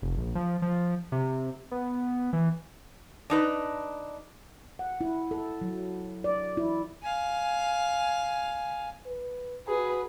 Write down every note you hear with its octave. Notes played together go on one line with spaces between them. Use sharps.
F1
A#1
F3
F3
C3
B3
E3
D4 D#4 B4
F#5
E4
A4
F#3
D5
E4
F5 G#5
B4
F#4 G#4 B4